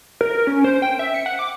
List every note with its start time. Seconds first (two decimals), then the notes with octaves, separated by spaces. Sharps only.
0.21 A#4
0.47 C#4
0.64 C5
0.82 G5
0.99 E5
1.14 C#7
1.26 F#5
1.39 D6